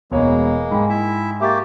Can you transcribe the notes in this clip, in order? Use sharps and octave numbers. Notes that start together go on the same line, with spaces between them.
E1 B2 G#3 A#3 C#5
G#2 G5 G#5 B5
E4 E5
A#3 G4 E5 C#6 A6